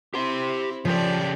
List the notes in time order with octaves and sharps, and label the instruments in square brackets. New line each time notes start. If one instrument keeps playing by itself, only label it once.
[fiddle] C4 E4 [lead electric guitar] G4 C6
[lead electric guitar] C#3 G4 [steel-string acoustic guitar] F3 [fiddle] A4 D5